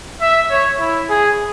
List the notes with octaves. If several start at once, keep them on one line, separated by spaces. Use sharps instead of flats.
E5
C#5
E4
G#4